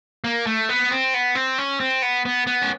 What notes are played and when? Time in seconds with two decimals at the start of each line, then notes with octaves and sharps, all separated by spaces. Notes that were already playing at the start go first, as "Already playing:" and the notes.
0.24 A#3
0.47 A3
0.69 B3
0.91 C4
1.14 B3
1.35 C4
1.58 C#4
1.80 C4
2.02 B3
2.25 B3
2.47 B3
2.62 C#4